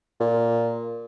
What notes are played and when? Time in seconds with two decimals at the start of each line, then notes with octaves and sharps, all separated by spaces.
0.21 A#2